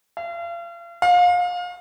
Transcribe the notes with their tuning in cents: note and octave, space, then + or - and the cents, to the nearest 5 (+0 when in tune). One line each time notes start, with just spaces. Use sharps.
F5 -40
F5 +30